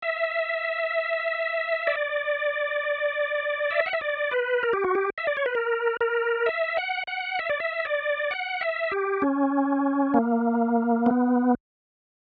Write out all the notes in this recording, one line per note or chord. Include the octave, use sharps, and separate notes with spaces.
E5
D5
E5
F#5
E5
D5
B4
A#4
G4
F#4
G4
E5
D5
C#5
B4
A#4
A#4
E5
F#5
F#5
E5
D5
E5
D5
F#5
E5
G4
C#4
A#3
B3